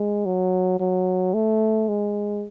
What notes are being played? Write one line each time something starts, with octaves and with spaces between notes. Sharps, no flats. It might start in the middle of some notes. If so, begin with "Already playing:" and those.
Already playing: G#3
F#3
F#3
A3
G#3